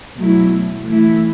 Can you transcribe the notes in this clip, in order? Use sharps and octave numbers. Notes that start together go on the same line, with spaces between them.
B2 F#3 A3 E4
E3 A3 E4